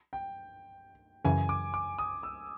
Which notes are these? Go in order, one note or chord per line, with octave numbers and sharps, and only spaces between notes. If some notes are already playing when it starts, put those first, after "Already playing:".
G5
F#2 C#3 E3 G#5
D6
D6
D#6
E6